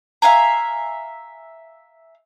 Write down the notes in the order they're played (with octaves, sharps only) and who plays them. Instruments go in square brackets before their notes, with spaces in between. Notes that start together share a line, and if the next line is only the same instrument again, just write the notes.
[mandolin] E5 F5 G#5 A#5